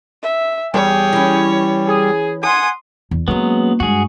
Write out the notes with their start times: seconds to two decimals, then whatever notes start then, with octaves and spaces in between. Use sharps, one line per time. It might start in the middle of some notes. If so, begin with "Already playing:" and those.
0.22 E5
0.74 E2 G3 G#4 C#5 G5
1.13 E3 C#4
1.87 G#4
2.43 F#5 G#5 C6 D#6
3.11 E2
3.28 F#3 G#3 A#3 B3 C#4
3.80 G2 G#3 F#4 G#4